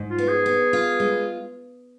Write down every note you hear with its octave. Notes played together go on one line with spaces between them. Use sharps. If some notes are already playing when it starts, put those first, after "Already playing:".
Already playing: G#2
F4
B3
G#4
B3
F4
G#3